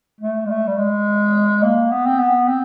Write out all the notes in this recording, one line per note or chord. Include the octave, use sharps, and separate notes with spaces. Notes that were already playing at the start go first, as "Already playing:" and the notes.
A3
G#3
A3
G3
G#3
A#3
B3
C4
B3
C4